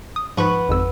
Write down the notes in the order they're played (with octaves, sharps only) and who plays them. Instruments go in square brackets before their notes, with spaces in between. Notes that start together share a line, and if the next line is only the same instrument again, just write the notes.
[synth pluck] D#6
[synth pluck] G#2 F3 C#6 [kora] B3 B4
[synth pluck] G#1 F2 E6